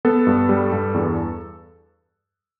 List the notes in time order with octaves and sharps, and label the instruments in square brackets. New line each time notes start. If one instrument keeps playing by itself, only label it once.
[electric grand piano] B3 A4
G2
G3
G2
E2